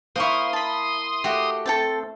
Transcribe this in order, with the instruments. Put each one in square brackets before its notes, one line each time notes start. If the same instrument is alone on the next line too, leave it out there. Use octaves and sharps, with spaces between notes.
[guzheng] A#3 E4 [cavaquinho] C5 F5 C#6 [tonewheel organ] C6 D#6
[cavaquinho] A5 B5
[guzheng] A3 [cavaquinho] F#4 G4
[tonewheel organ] C4 [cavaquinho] A4 G5 A5